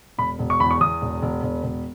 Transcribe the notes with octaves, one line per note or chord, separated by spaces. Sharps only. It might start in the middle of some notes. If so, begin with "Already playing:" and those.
E1 B5
E1
C#6
E2 B5
C#6
E2 D#6
E1
E1
E1
E1